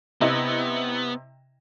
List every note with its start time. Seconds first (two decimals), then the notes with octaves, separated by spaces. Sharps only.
0.21 C3 B3 E4 D#5